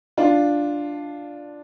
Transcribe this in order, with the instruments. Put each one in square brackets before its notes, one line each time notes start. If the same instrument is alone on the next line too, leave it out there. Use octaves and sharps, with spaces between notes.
[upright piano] D4 F4